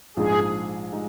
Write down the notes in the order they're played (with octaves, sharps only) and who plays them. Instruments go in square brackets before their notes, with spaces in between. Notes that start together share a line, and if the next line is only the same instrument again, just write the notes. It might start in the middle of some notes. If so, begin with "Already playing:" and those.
[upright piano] A#1 G#2 F3 G#3 D#4 [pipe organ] G#4
[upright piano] G#3 D#4